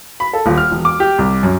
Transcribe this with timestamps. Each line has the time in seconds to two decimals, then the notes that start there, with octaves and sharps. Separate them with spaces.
0.20 B5
0.33 A4
0.46 D#1
0.58 F6
0.72 E1
0.85 D6
1.00 G4
1.19 C2
1.43 F#2